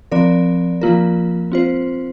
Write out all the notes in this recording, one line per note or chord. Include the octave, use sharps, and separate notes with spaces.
F3 C4 A#4 D5
F3 A#3 F4 A#4
C4 F4 C5